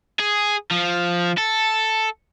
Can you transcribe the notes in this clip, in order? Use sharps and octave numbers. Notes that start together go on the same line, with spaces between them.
G#4
F3
A4